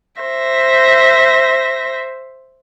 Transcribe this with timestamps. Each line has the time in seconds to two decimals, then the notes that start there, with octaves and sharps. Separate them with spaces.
0.21 C5 E5 A#6